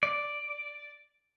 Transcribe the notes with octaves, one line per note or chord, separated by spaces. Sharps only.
D5